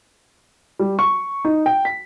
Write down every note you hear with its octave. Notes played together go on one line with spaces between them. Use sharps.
G3
C#6
D#4
G5
B6